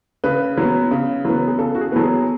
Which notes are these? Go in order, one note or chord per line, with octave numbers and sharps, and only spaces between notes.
C#3 B4
F#3 B3
C#3
F#3 B3
G#4
C#3 A4
F#4
G#4
F#3 B3 A4
G#4